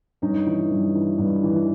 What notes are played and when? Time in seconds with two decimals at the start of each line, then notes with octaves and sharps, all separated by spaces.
0.22 G2 C#4 D#4
0.46 E3
0.71 G2
0.95 E3
1.19 G2
1.43 E3